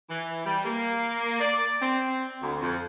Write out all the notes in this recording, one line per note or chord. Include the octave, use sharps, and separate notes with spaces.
E3
G3
A#3
D5
C4
D2
F2